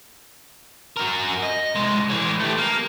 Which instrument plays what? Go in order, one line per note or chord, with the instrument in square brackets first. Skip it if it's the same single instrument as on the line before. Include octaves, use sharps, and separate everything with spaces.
[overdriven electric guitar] F#4 A#4
D#5
C2 G#3
E3 C#5
A3 G4
A#3 A#4